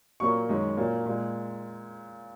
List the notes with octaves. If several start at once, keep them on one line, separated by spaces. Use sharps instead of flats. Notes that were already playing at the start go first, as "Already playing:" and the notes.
A#2 F#3 A#3 C#6
F#2 D#3 G#3
A#2 F#3 A#3
A#2 G#3